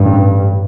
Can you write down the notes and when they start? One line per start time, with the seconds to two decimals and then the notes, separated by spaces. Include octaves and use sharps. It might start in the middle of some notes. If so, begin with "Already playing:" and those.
Already playing: A1 G2